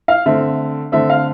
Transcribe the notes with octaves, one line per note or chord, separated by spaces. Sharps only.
F5
D3 A3 C4 E5
D3 A3 C4 E5
F5